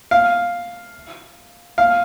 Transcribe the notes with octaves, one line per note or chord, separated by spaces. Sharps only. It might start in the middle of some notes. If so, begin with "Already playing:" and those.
F5
F5